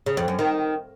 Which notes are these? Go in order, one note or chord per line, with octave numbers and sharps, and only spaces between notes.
C#3
F2
F#2
D#3